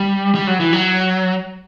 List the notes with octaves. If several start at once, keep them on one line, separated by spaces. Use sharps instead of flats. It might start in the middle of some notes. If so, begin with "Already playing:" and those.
Already playing: G3
G3
F#3
E3
F#3